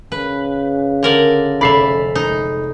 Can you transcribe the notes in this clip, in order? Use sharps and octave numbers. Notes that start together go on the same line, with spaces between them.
C#3 B4
D3 A#4 D5
F1 D5 E5 B5 C7 F7
G#3 D#4